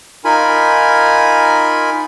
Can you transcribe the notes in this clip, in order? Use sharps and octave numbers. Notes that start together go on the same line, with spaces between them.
D#4 F4 A#4 G#5 B5